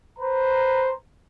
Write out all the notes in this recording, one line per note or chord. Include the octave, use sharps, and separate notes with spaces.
B4 C5 A#5